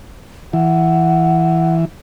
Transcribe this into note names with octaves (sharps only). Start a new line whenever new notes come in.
E3 F#5